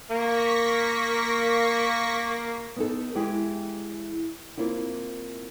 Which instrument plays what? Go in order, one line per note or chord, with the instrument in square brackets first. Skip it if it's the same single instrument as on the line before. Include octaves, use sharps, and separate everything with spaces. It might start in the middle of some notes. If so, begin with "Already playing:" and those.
[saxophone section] A#3 [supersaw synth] C#6 A#6 B6
[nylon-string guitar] B3 D#4 A4
E3 G#3 E4 G4
A#3 C4 E4 F4